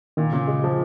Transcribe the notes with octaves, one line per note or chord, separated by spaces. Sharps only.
A#2 D#3
A#2 C#3
G#3
F3